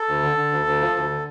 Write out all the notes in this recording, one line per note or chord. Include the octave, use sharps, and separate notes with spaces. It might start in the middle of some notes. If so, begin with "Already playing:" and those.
Already playing: A4
D2
D3
D3
D2
D2
F3
D2
D3